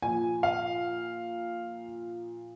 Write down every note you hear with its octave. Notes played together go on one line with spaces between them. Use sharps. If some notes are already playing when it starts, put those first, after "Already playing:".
A#2 F3 G#5
F5